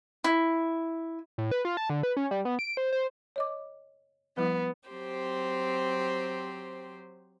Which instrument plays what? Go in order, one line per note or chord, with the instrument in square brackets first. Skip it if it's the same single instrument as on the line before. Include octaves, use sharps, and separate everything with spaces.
[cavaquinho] E4
[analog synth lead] A2
B4
F4
A5
D3
B4
C#4
G3
B3
D7
C5
C5
[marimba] C#5 D#5 D6
[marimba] F3 G3 E4 [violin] B3
[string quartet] F#3 C4 G4 C5